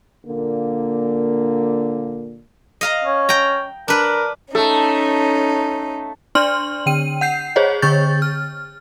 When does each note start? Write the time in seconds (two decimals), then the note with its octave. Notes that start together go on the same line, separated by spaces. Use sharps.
0.26 A#2 D3 A#3
2.81 D#5 F5 A#5
3.04 C#4
3.29 G5 A#5
3.88 D4 A#4 B4
4.55 A3 C#4 D#4 A4
6.35 D4 D5 C6 F6 F#7
6.86 D3 G5 D#7
7.21 F#5 G6 C7
7.56 G#4 C5 C#5 D#5
7.82 D3 C#6 G6 A6
8.22 F6